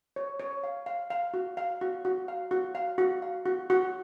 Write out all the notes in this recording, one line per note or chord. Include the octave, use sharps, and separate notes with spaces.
C#5
C#5
F5
F5
F5
F#4
F5
F#4
F#4
F5
F#4
F5
F#4
F5
F#4
F#4